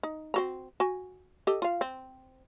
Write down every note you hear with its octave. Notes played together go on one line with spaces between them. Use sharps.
D#4
C4 F#4 A#5
F#4 G#5
G4 A4 D#5
F4 F5
C4